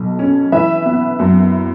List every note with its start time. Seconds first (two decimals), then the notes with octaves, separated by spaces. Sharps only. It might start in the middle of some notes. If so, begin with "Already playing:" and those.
Already playing: B1 B2
0.19 C#4
0.52 E3 B4 E5
0.86 B3
1.19 F#2